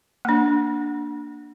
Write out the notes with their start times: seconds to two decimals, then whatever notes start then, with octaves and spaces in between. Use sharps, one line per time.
0.25 A#3 D4